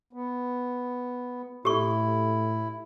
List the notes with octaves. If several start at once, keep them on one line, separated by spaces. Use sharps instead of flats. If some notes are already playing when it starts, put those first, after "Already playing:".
B3
A2 E4 G4 A4 C#6